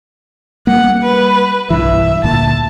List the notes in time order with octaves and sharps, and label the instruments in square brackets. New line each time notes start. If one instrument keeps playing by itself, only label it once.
[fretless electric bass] G3 A#3 [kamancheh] F#5
[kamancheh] B4
[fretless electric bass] B1 G2 E3 [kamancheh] E5
[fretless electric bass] D2 A#2 [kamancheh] A5